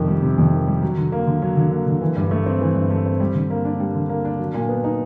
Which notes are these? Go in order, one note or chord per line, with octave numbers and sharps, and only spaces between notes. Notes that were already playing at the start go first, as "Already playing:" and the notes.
Already playing: F2 C3 D#3
G3
C3
F2
D#3
G3
F#3
D3
A#3
D3
F#3
D3
A#3
D3
E3
G2
A3
C4
E3
G2
A3
C4
G3
D3
A#3
D4
G3
D3
A#3
D4
F#3
A#2
B3
D#4